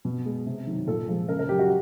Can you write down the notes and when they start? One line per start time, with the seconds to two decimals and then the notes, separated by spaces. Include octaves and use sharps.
0.05 B2
0.25 G#3
0.46 C3
0.67 D#3 F#3
0.87 A#2 A4
1.08 F3 G#3
1.28 C#3 A#4
1.39 A#4
1.49 F#3 G4
1.59 F#4